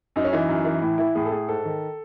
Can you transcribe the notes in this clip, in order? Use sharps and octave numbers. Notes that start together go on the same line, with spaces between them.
F#2 D#4
C#4
E3 D#4
F#2
E3
A2 E4
E3 E4
A2 G#4
A4
A2 G#4
G#2 A4
D#3